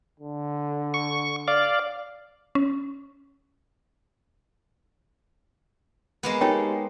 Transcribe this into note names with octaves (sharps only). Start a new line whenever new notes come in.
D3
C#6
D5 F5
C#4
G#3 A#3 B3
D#4 G4 A4 A#4 C#5 G5